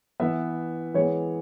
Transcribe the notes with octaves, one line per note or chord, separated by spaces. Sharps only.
E3 B3 B4 E5
E3 G#3 B3 C#5